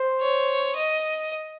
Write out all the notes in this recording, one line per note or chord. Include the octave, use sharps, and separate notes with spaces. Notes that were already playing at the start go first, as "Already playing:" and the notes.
Already playing: C5
C#5
D#5